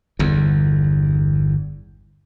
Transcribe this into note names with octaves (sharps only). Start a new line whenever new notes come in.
G1 E2